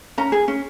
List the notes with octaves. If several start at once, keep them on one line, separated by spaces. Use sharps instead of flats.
C#4 A#5
G#4
C#4